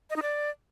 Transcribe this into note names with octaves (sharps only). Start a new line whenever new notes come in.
D#5
D#4
D5